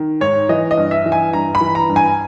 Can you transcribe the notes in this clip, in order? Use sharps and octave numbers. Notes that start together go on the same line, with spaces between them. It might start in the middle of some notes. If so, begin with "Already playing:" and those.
Already playing: D#3
G#2 C#5
E3 D#5
D#5
G2
E5
E3
G#5
G2 A#5
B5
E3
A#5
G2
G#5